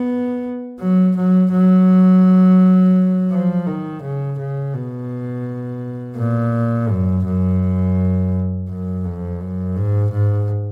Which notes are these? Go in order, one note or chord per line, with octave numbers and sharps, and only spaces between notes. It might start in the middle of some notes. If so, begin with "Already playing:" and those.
Already playing: B3
F#3
F#3
F#3
F3
D#3
C#3
C#3
B2
A#2
F#2
F#2
F#2
F2
F#2
G#2
G#2